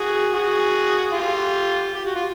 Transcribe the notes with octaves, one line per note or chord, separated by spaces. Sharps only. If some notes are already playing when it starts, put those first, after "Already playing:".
Already playing: F#4 G#4
F#4 G#4
F4 G4
G4
F#4
F4